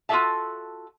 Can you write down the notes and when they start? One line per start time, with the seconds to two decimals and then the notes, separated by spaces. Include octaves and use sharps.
0.09 F4 F#4 G#4 A4 E5 A5